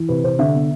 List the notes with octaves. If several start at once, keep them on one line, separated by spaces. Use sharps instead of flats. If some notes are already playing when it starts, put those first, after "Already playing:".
Already playing: E3
C3 B4
C3 C5
D3 E5
B3